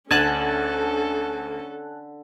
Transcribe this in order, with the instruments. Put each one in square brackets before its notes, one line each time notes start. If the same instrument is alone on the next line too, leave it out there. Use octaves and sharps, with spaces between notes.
[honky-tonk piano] D2 [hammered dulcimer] D3 [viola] C#4 A4 [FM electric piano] G#5 A5 F#6